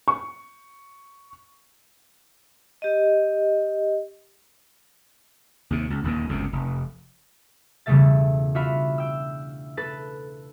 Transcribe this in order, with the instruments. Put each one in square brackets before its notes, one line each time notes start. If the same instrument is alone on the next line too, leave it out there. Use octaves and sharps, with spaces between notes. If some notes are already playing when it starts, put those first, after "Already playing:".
[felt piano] C#6
[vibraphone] G4 D#5
[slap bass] D#2 C3
C#2
D#1 D#2 A#2 D3
G1 C#2 F#2 C3
F1
[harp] E1 C#3 G3 A3 E5 A6
D4 F4 F#4 E5 F5 B5
G5 E6
A4 B4 A6